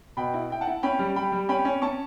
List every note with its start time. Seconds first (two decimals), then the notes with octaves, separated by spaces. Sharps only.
0.17 B2 G5 B5
0.34 E4
0.50 E4 G5
0.61 F#5 A5
0.67 E4
0.83 C#4 G5 B5
0.99 G3
1.16 G3 G5 B5
1.32 G3
1.49 C#4 G5 B5
1.65 C#4
1.82 C#4 A5 C#6